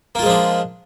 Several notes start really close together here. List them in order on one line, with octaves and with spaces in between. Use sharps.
A#3 F4 G#3 F3 D4